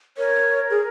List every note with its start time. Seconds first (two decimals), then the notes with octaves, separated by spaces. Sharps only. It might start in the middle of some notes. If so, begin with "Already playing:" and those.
0.18 A#4 C#5
0.70 G#4